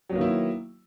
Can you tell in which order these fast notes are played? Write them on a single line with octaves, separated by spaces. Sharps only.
F#3 B3 A#3 D#3 E4